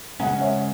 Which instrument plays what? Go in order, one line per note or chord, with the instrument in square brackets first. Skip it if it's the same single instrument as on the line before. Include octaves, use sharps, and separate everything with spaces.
[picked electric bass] C#3 G#3 C#4 [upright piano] F#5 A#5
[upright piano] C#5 E5